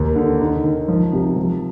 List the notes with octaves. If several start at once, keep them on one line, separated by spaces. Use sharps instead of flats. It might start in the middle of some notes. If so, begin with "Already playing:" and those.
Already playing: D#2
D3
D#3
D#3
F3
C3
F3